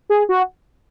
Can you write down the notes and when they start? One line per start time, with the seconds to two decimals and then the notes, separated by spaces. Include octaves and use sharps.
0.10 G#4
0.29 F#4